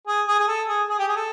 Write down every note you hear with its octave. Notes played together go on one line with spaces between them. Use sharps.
G#4
G#4
G#4
A4
G#4
G#4
G4
G#4
A4